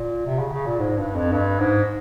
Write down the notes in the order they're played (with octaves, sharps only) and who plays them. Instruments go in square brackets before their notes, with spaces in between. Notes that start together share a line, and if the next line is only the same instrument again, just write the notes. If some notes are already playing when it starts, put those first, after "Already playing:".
Already playing: [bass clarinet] A#2
C3
C#3
C#3
A#2
G#2
G2
F2
G2
G#2